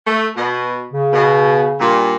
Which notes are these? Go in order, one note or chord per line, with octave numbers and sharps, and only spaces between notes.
A3
B2
C#3
B2
G2 A#2